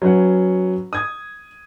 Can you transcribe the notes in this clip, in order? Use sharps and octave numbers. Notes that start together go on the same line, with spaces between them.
F#3 C#4 B4 F#5
D#6 G#6